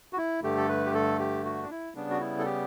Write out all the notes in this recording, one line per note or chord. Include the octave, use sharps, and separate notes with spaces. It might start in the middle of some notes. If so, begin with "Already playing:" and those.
F#4
E4
G2 D3 A3 G4
A4
B4
G4
A4
G4
F#4
D4
E4
C#3 G3 B3 D4
F#4
E4
A4
G4